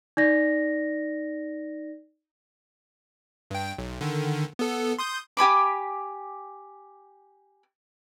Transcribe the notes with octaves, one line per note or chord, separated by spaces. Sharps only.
D#4 D5 A#6
G2 G5
B1
D3 D#3
B3 A4
C6 D#6 G6
G4 G#5 B5 D6